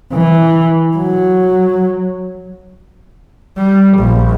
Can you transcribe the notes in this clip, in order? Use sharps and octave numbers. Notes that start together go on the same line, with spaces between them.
E3
F#3
G3
A#1